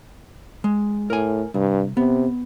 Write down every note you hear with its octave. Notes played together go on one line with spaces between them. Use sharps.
G#3
A2 A#4 G#5
C2 G2
C3 B3